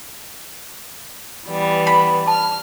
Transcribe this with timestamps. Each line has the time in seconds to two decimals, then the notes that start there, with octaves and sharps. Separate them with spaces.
1.46 E3 G3 B3
1.87 B5
2.28 A5 F6